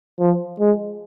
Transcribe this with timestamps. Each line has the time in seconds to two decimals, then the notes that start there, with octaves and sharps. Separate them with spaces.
0.20 F3
0.59 G#3